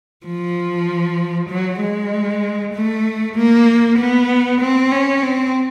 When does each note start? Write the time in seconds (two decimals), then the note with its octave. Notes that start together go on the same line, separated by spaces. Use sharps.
0.26 F3
1.49 F#3
1.81 G#3
2.74 A3
3.36 A#3
3.98 B3
4.60 C4
4.91 C#4
5.22 C4